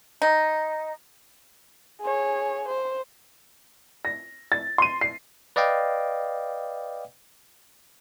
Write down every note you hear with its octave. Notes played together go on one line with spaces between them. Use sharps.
D#4
G#4 C#5
C5
A#6
A6
C6 D#7
C7
B4 D5 D#5 F5 G5